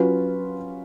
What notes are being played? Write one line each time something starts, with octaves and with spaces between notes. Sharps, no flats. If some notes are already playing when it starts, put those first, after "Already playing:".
Already playing: F#3 C#4 F4 B4